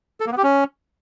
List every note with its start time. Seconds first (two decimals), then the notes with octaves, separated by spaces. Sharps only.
0.20 A4
0.26 A#3
0.32 B3
0.37 G4
0.43 C#4